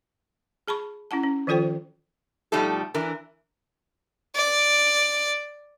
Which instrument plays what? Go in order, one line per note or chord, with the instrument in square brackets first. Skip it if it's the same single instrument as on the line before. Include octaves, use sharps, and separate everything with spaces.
[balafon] G#4 A5 B5 C#6
C#4 E4 F#5 A5
C#4
D#3 F3 F4 A4 C5 G5
[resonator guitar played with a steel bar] B2 F3 G3 A3 D#4 A4
E3 D4 A#4
[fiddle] D5